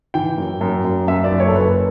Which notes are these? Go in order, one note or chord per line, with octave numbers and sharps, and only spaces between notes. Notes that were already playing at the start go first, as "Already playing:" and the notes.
E3 G5
F#2
F#2
F#2
F#2 E5
D5
F#1
C#5
A4
F#1 B4